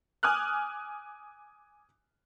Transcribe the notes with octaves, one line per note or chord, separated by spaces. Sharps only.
G#5 D6 D#6 F6 F#6